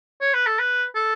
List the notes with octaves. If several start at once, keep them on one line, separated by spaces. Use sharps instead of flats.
C#5
B4
A4
B4
A4